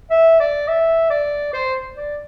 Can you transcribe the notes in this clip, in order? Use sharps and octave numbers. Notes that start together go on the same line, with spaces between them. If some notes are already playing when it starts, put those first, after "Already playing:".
E5
D5
E5
D5
C5
D5